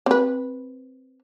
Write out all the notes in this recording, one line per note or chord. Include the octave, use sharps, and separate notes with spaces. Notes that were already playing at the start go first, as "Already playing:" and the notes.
C4 B4